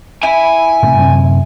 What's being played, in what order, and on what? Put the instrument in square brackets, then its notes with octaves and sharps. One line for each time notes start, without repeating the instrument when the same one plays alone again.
[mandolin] E4 [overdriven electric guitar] G#5
[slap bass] A2 C3 A3
F#2 C3